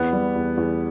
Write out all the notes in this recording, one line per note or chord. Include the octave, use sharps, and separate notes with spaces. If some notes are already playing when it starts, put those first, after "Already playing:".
Already playing: E2 B3
G3
E2
E2